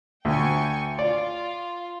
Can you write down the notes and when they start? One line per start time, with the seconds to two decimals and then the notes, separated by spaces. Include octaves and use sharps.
0.25 D2 G5 G#5 C#6
0.99 F4 D5